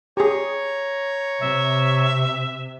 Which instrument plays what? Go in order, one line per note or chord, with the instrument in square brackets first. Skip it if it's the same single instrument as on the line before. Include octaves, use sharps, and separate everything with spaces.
[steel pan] G4 G#4 [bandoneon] C#5 A#5 C#6
[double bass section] C3 [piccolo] E5